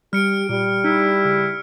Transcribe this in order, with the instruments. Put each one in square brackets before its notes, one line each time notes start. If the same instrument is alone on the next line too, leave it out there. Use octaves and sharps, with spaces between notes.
[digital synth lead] G3 [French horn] G4 [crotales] F6 C#7 D7
[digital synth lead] A#2 [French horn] G3
[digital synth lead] D#4 [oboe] E4
[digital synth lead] C#3